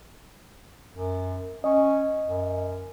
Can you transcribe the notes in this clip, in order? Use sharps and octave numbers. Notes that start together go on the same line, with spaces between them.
F#2
C#4 D#5
F#2